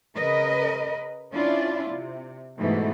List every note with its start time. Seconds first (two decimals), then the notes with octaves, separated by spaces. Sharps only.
0.15 C#3 A#4 B4 D#5
1.33 C#4 D4 E4 F4 D5
1.91 C3
2.59 G#2 B2 E3 A3